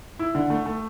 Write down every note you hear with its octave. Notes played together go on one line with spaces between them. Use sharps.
E4
D3
A3
A3